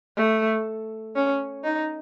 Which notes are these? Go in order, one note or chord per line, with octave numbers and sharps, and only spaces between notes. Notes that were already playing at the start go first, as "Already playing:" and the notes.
A3
C#4
D#4